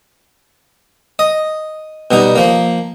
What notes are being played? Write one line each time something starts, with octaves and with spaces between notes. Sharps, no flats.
D#5
B2 G3 D#4
F3 A#3